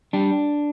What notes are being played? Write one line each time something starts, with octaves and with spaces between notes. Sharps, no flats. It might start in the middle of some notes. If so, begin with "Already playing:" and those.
G3 D4